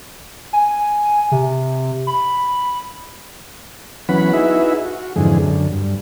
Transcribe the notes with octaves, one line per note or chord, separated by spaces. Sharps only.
G#5
C3
B5
E3 F#3 B3 C#4 F#5 B5
D#4 E4 F#4 G#4 B4 E5
F#4
F2 G#2 D3 E3 G#4
F#2 D3
G2